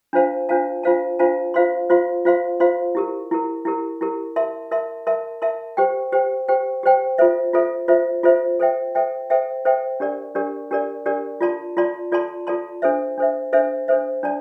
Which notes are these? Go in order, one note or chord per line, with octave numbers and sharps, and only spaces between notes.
D4 F4 C5 F5 A5
D4 F4 C5 F5 A5
D4 F4 C5 F5 A5
D4 F4 C5 F5 A5
F4 C5 F5 C6
F4 C5 F5 C6
F4 C5 F5 C6
F4 C5 F5 C6
E4 G4 A#4
E4 G4 A#4
E4 G4 A#4
E4 G4 A#4
A#4 E5 A5 C6
A#4 E5 A5 C6
A#4 E5 A5 C6
A#4 E5 A5 C6
G4 C5 G5
G4 C5 G5
G4 C5 G5
G4 C5 G5
F4 A4 C5 E5
F4 A4 C5 E5
F4 A4 C5 E5
F4 A4 C5 E5
A4 C5 E5 G5
A4 C5 E5 G5
A4 C5 E5 G5
A4 C5 E5 G5
D4 G4 A#4 D5
D4 G4 A#4 D5
D4 G4 A#4 D5
D4 G4 A#4 D5
F4 A4 D5 A5 C6
F4 A4 D5 A5 C6
F4 A4 D5 A5 C6
F4 A4 D5 A5 C6
D4 A4 C5 E5
D4 A4 C5 E5
D4 A4 C5 E5
D4 A4 C5 E5
D4 A4 D5 A5